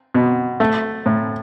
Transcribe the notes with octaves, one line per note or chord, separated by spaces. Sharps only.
B2
A3
A2